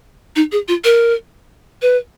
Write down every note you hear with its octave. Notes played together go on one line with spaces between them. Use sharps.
D#4
G#4
F4
A#4
B4